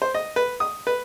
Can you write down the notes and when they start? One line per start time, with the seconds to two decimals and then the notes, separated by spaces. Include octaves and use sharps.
0.02 C5
0.15 D#5
0.36 B4
0.60 D#6
0.87 B4